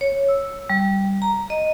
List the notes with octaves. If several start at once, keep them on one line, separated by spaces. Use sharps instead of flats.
C#5
E6
G3
A#5
D#5